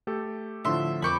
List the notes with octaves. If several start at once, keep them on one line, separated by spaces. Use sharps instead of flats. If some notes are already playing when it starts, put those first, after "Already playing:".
A3 G4 A4
A2 D3 F3 E5 C6
F2 A#4 B5 C#6 D6 G6